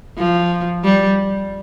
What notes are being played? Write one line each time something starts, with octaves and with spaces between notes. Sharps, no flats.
F3
G3